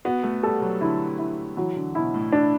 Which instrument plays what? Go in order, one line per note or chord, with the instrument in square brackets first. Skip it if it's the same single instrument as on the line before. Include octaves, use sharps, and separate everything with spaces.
[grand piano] B3 [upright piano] F#4
[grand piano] A3
[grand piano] G3 [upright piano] A4
[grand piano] F#3
[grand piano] D3 [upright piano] E4
[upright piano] E4
[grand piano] E3 [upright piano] F#3
[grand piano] D3
[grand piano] B2 [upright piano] E4
[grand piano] A2
[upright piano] D4